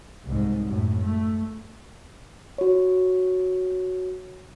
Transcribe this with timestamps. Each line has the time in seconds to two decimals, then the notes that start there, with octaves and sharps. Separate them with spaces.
0.25 C2 G#2
0.66 F#2 A2
1.01 A3
2.58 F#4 C#5